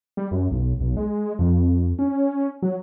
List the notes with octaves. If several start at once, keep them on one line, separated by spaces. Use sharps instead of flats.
G3
F#2
B1
B1
G#3
F2
C#4
F#3